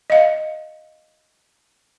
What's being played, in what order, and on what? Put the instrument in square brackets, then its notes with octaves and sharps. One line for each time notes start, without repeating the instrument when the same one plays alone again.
[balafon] D#5 F5